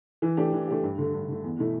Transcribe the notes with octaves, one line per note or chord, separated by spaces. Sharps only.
E3
A3 D4 G4
E3
A3 D4 G4
G2
D3 A3
G2
D3 A3
E2
B2 A3 E4